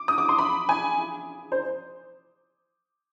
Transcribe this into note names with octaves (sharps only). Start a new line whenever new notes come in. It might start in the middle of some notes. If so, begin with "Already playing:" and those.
Already playing: D6
D#6
D6
C6
B5
G#5
C5